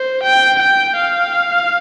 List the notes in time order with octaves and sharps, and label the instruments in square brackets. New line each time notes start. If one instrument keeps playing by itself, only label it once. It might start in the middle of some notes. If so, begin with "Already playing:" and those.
Already playing: [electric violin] C5
G5
G5
F5